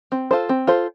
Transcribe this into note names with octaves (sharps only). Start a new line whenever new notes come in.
C4
F4 A4 C5
C4
F4 A4 C5